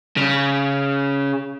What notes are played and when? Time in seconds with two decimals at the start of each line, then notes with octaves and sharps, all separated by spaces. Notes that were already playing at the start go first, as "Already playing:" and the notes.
0.17 C#3